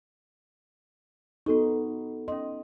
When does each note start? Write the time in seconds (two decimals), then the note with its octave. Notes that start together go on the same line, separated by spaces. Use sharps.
1.46 B3 D#4 F#4 A4 C#6
2.28 C#4 D#5 C6